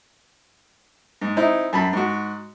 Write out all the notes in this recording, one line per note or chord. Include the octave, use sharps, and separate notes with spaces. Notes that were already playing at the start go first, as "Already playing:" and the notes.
G#2
C4 D#4 E4
F#2 A5 B5
G#2 F#4